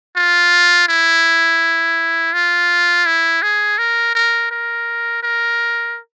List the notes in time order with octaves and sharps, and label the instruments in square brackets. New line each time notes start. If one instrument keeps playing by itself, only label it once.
[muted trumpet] F4
E4
F4
E4
G#4
A#4
A#4
A#4
A#4